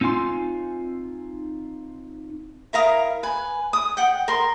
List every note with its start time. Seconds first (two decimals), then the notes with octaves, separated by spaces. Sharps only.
0.01 C4 D#4 F4 G#5 C6
2.73 E4 A#4 F5 D#6
3.23 B4 G#5
3.73 D#6
3.97 F#5 G5
4.28 A#4 C6